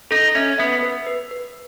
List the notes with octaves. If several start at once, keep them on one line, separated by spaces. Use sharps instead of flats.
D#4 A4
C#4 E5
B3 E5
B4
B4
B4